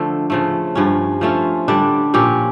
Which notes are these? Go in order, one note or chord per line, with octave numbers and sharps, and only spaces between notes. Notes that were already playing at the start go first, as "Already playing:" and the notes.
Already playing: D3 F3 A3
C#3 F3 A3
G2 F3 C#4
F3 A3 C#4 F4
D3 G3 D4
A#2 F3 C#4 G4